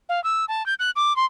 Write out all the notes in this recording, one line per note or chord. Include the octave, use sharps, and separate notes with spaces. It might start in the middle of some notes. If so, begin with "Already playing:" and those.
F5
E6
A5
G6
F#6
D6
C6